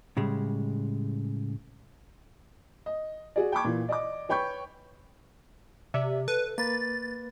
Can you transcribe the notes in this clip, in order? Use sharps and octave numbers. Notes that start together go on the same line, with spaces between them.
A2 C#3 G3 G#3
D#5
F#4 G#4 D5
G5 A5 B5 C#6 D6 G#6
A#2 E3
D5 D#5 D6
B4 C#5 G5 B5 C#6 G6
C3 D5 E5
A4 B4
A#3 B4 A6